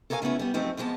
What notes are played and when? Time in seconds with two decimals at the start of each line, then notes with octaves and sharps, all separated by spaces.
0.10 A4 A#4 C#5 D5 F5 G#5
0.22 C#3 A3 B3 C#4 E4
0.39 G3 B3
0.54 F#2 F3 A3 C4 D#4
0.77 F2 F3 G#3 B3 A5